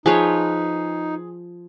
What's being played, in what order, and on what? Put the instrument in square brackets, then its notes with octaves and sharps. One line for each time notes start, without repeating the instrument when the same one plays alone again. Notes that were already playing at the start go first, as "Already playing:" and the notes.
[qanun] F3 B4 C#5 [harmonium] D#4 [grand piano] G#4